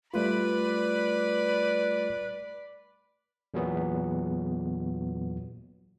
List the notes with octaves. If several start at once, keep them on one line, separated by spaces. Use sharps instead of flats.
G3 A3 F4 B4 D5 B5
E2 A#2 F#3 B3